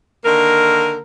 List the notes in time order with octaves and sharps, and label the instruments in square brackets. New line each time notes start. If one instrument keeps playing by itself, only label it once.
[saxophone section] D3 D#3 A#3 A#4